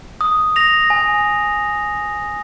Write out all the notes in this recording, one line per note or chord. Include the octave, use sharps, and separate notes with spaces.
D#6
A#6 F7
G#5